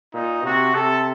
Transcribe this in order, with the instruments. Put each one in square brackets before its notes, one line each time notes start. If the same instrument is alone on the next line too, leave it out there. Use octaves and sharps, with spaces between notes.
[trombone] A#2 [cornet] D#4
[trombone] C3 [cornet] F#4
[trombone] C3 [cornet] A4